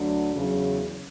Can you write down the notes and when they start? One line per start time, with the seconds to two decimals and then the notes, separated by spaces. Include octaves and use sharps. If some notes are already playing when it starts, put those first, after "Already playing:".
Already playing: D2 D3 F#3
0.34 E2 C#3 F#3